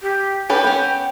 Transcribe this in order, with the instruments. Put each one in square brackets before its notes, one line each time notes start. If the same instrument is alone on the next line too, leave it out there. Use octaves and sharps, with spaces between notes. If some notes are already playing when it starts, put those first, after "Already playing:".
[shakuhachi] G4
[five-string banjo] C#4 A4 B4 [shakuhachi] G5
[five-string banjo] B3 C#4